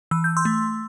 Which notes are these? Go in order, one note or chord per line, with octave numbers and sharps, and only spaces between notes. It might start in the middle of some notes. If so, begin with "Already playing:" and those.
E3 E6
G6
C6 E6
A3